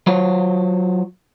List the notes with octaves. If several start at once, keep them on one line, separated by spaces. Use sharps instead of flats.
F#3 F4 C5 C#5